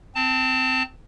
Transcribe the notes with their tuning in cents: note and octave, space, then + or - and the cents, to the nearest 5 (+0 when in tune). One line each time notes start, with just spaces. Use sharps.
C4 -15 A5 +15